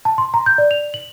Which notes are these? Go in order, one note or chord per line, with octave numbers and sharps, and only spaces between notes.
A5
C6
A#5
G6
D5
F7
F#7